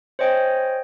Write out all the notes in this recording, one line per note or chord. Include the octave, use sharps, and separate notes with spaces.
C5 C#5 D#5 G5 G#5